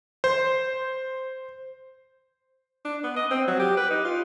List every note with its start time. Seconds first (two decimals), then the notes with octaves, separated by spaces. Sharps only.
0.24 C5
2.85 D4
3.04 B3
3.17 D#5
3.31 C4
3.48 F#3
3.60 G4
3.77 B4
3.91 D#4
4.05 F4